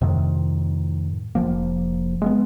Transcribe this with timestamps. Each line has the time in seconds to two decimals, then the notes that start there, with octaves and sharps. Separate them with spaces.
0.01 F2 A2 C3 D#3
1.35 F1 F3 A#3
2.22 G#3 A3 B3